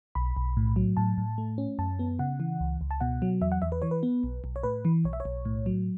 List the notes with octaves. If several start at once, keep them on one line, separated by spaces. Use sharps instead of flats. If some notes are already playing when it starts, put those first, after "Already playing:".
B1 B5
B1
A2
F#3
A2 A5
A2
A3
C#4
F#2 A5
B3
C#3 F#5
E3
C#2
C#2
A5
B2 F#5
F#3
E2 E5
F#5
E2 E5
B4
E3 C#5
B4
B3
B1
B1
C#5
A2 B4
E3
B1 C#5
E5
C#5
B1
A2
F#3